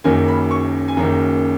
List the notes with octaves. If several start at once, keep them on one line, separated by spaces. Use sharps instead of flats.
F#1 F#2 D#3 A#3 G#5
B5
C#6
G#5
F#1 F#2 D#3 A#3 A#5